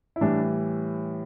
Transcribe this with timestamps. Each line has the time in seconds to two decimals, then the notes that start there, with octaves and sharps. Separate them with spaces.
0.16 E4
0.21 A2 E3 G3 D4